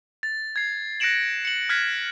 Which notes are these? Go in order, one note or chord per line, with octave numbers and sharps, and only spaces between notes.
A6
G#6 C7
F#6 A#6 C#7 D7 E7 F#7
C#7 F#7
F6 F#6 G#6 B6